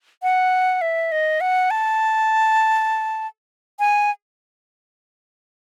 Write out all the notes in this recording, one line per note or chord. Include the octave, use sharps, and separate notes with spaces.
F#5
E5
D#5
F#5
A5
G#5